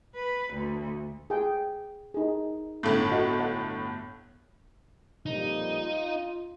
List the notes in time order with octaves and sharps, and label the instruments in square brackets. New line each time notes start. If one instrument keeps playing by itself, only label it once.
[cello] B4
D2
[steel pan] G#4 G5
D#4 G#4
[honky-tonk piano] G1 A2
[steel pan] F#4 D#5 F#5
C#5 F#5
[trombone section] F2 A#2 G3 [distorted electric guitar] D#4
[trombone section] F4